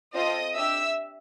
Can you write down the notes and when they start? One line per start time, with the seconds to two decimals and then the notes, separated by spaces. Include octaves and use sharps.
0.15 C4 F4 A4 D#5 D#6
0.55 D4 G4 E5 E6